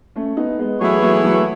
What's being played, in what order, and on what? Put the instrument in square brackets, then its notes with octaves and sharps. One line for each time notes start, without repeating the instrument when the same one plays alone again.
[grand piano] A3 C#4
B3 D#4
G#3 B3
[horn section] E3 B3 E4 G#4 C#5 [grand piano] F#3 A3
[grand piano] F#3 A3
F#3 A3